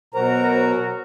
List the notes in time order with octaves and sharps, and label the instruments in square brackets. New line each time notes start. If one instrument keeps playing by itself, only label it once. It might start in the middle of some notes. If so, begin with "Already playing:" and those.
[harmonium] B2 A#5 [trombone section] F#3 F#4 A#4 [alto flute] C5